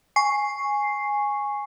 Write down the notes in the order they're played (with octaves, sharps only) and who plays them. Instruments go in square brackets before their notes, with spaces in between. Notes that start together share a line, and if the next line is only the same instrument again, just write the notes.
[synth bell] G#5 C#6 C7